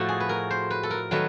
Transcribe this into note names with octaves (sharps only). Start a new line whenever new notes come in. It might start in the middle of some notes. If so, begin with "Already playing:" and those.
Already playing: A2 F3 A3 F#4
G#4
B4
A#4
C5
B4
A4
A#4
D#3 F#3 A3 B4